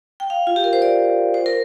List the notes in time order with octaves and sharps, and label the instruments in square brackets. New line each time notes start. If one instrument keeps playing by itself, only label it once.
[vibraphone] G5
F5
F4
G4
A#4
C5
D5
C5
A#4